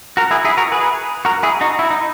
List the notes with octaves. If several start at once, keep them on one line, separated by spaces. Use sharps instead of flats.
F#4 A#4
E4 G#4
E4 G#4
F#4 A#4
G#4 B4
F#4 A#4
E4 G#4
D#4 F#4
E4
D#4